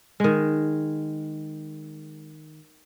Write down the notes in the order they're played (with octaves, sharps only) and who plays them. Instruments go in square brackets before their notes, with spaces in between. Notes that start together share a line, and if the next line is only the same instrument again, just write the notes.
[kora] D#3 G#3